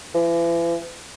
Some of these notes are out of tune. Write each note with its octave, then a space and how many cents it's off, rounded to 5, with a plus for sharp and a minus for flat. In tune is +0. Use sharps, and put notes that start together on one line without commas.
E3 +40